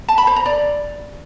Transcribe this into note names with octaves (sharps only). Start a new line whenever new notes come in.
A5
B5
C5
A#5
D5